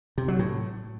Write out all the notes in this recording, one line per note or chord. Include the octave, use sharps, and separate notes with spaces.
C3
F#3
A2